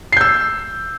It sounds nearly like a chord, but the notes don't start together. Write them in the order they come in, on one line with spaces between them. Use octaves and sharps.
C7 G6 E6